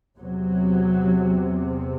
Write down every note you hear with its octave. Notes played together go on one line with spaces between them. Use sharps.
E2 C3 F#3